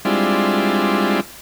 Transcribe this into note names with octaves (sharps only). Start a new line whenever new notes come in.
G3 G#3 C4 D4 E4 F4